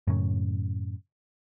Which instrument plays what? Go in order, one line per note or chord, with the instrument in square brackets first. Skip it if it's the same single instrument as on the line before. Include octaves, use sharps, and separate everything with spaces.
[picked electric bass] F#2 A2 C#3